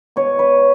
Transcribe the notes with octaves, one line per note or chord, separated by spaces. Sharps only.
B2 C#5
B4